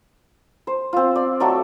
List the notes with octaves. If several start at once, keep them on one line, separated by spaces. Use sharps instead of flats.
C5
C4 F4
D5
F#3 A3 A4 D5